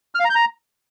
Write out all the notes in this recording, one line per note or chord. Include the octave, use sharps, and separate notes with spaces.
F6
F5
A#5
G6
A#5